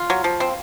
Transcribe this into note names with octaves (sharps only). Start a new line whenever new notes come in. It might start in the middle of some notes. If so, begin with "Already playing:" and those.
Already playing: F4
F#3
F3
C4